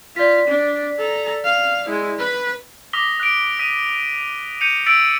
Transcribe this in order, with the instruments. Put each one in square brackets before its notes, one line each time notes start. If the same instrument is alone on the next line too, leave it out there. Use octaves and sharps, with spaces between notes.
[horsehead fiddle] F4 [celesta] D5 B6
[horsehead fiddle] D4
A4 A#5
F5
G#3 E4
B4 B5
[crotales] D6 D#6 A#6 B6 G7
F#6 D7
D#6 B6 D#7
G6 C#7 D#7 F7
E6 A6 B6 D7 F#7